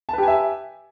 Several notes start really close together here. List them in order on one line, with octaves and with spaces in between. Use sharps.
A5 B4 G4 G#5 E5